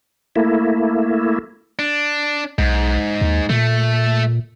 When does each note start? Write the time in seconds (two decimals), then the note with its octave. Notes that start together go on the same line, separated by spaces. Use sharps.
0.36 A3 A#3 E4
1.79 D4
2.58 B1 G#2
3.21 D#2
3.50 A#2 A3